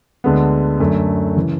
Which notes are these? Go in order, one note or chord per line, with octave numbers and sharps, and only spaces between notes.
D2 D3 G#3 B3
F#2 D3 A3
C#3 E3